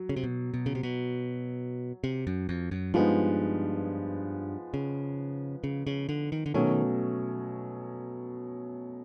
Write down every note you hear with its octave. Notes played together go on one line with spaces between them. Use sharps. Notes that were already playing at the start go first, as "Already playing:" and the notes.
Already playing: F#3
C#3
C3
B2
B2
C#3
C3
B2
C3
F#2
F2
F#2
G2 F3 G#3 B3 D#4
C#3
C#3
C#3
D3
D#3
D3
B2 D#3 F#3 A3 C#4